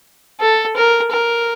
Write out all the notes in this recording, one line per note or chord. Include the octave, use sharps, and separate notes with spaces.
A4
A#4
A#4